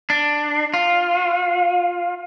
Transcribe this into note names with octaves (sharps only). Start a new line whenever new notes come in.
D4
F4